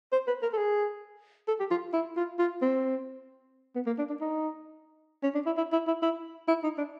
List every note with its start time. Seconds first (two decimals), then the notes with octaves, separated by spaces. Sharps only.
0.13 C5
0.28 B4
0.43 A#4
0.53 A4
0.58 G#4
1.48 A4
1.60 G4
1.71 F4
1.93 E4
2.17 F4
2.39 F4
2.62 C4
3.76 B3
3.87 A#3
3.99 D4
4.09 D4
4.21 D#4
5.23 C#4
5.35 D4
5.46 E4
5.57 E4
5.73 E4
5.88 E4
6.03 E4
6.48 E4
6.64 D#4
6.78 D4